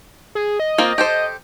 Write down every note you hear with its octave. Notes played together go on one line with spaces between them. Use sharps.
G#4
D#5
A#3 C4 F4
G4 A4 C5